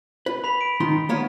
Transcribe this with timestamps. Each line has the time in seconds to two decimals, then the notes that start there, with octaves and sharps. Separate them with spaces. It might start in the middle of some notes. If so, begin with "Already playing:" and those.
0.26 B4
0.44 B5 B6 F7
0.61 D7
0.80 D#3 D#4 C6
1.09 A#3 B3 C#5